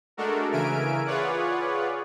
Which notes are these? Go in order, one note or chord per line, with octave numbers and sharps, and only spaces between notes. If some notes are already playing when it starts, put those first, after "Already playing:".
G#3 A3 D4 F#4 A4 A#4
C#3 E3 A#4 E5 G#5 D7
F4 G#4 B4 C#5 D5 F#5